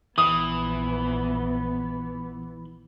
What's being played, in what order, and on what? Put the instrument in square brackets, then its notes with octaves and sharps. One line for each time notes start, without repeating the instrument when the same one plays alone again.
[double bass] A#1 B3 [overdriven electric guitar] E3 [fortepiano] D#6